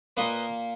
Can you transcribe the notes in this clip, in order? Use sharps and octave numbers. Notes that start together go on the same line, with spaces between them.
A#2 A#3 B4 D#5